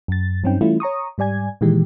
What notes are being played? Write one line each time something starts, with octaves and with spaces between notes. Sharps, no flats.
F#2 A6
G2 F#3 C4 C#4 D#4 G5
E3 G3 A3 C#4 E4 F4
C#5 A#5 C#6 D#6
G#2 G3 D5 G#5 G#6
A#2 D#3 E3 G#3 G4